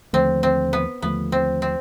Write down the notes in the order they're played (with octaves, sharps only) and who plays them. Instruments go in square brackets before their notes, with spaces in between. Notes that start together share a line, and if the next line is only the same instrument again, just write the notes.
[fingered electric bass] D#2 D3 F3 A3 [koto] C4
[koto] C4
B3
[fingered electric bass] D#2 D3 F3 A3 [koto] B3
[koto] C4
C4